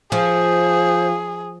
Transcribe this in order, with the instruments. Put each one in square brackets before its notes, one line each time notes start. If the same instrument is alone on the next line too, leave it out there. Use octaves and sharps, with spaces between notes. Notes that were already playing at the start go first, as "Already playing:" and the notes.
[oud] F3 [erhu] G#4 [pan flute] C5